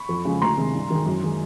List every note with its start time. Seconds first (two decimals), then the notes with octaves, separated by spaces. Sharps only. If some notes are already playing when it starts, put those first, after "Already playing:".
Already playing: B5 C#6
0.09 F2
0.25 C#3 F3 G#3
0.42 D2 A#5 C6
0.57 C3 D#3 G#3
0.74 G2
0.90 D#3 G#3
1.06 F#2
1.23 D#3 G#3